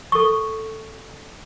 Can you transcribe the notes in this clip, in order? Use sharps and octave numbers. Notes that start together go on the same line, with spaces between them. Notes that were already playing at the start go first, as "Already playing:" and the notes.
A4 C#6